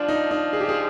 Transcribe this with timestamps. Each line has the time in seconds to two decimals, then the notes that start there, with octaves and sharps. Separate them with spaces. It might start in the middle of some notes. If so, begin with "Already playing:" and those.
Already playing: F3 D4
0.09 D#4
0.31 D#4
0.53 G#4
0.60 G4
0.68 G#4